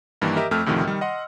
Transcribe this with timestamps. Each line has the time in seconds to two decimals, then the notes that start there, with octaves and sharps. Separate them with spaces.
0.22 G2 D#3 E3 A#3
0.37 G4 A#4 D#5 E5
0.51 F2 A3 E6 F6
0.66 D2 A2 C3 D#3 F3
0.84 D#3 G3
1.01 D#5 F#5 C6